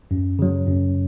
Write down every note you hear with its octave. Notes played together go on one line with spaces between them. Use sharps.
F#2
C#3 F#3
F#2